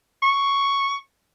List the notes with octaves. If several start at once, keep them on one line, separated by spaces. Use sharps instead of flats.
C#6